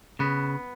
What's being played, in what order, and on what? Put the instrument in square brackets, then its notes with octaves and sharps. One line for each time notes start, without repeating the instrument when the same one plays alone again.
[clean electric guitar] C#3 [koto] B3